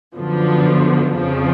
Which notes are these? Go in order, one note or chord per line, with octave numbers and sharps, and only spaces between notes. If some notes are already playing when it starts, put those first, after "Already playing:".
F#2 D3 F3 B3
F2 C#3 F3